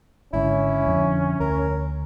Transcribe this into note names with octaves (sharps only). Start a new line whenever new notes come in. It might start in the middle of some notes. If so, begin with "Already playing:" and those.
G#1 G#2 D3 C#4 E4
F2 D3
D2 A#4